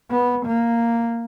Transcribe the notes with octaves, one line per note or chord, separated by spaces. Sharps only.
B3
A#3